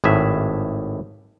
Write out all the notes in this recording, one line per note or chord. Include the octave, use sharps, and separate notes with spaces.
G#1 A2 G#4 E5